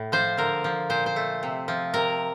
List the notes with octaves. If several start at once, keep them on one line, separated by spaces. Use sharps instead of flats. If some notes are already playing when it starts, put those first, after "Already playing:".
Already playing: A2
F3 C5
D3 A#4
F3
A#2 C5
C5
A3
C3
F3
C3 A#4